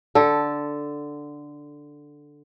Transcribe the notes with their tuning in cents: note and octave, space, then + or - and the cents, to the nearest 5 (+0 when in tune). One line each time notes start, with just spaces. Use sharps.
D3 +0 A4 +0